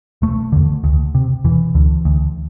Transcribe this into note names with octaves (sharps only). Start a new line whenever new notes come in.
E1 A3
E2 D3
D2
C3
E1 E3
D2 D3
D2